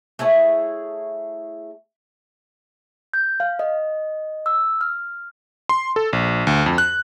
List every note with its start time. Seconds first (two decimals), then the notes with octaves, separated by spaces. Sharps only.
0.19 A3 E4 G#4 C#5
3.14 G6
3.40 F5
3.59 D#5
4.46 E6
4.81 F6
5.69 C6
5.96 A4
6.13 A#1
6.47 D2
6.66 F2
6.78 F#6